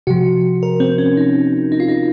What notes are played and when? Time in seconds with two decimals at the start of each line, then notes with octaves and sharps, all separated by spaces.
0.07 C3 F3 F#4
0.63 A#4
0.80 C4
0.98 C#4
1.17 D#4
1.72 D#4
1.80 F4
1.88 D#4